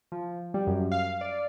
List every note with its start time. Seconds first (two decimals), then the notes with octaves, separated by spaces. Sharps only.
0.12 F3
0.54 G3
0.67 F#2
0.92 F5
1.21 D5